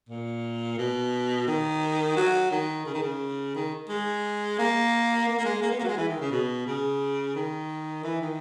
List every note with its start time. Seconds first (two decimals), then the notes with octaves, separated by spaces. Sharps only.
0.09 A#2
0.77 B2
1.47 D#3
2.16 F#3
2.51 D#3
2.85 C#3
2.93 D#3
3.02 C#3
3.55 D#3
3.89 G#3
4.58 A#3
5.27 A#3
5.38 A#3
5.45 G#3
5.62 A#3
5.71 B3
5.79 A#3
5.83 F#3
5.87 G#3
5.97 E3
6.08 D#3
6.20 C#3
6.31 B2
6.66 C#3
7.35 D#3
8.04 E3
8.21 D#3